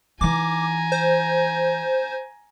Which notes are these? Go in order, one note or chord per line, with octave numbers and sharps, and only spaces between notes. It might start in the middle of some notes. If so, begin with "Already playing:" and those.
E3 D#4 G#5 A#5 D6
C5